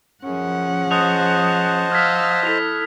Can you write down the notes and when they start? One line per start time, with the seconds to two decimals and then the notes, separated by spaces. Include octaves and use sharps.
0.24 F#2 F3 C#4 G#4 F#5
0.91 C5 D#5 A5 D#6 F#6 F7
1.92 F5 E6 F6 G#6 B6
2.45 E4 A4 B6 F7